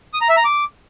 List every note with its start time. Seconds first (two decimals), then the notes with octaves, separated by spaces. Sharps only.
0.14 D#6
0.21 A#5
0.29 E5
0.37 A#5
0.45 D6